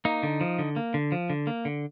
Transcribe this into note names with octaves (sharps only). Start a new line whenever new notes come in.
A#3 D#4
D3
F3
D3
A#3
D3
F3
D3
A#3
D3